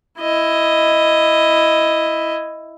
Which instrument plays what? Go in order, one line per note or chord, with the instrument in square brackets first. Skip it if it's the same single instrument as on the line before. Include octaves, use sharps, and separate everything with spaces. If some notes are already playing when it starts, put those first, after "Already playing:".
[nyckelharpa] E4 D#5